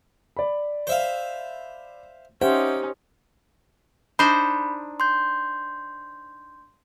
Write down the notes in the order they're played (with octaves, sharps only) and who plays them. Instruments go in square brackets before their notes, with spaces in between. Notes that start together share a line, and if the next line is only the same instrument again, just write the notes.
[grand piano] D5 B5
[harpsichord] C5 E5 F5
[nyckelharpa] C#4 D#4 [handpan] G4 C5 [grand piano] E5 F#5 [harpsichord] G5
[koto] D4 D#4 C5 [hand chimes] B5
[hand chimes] C6 G6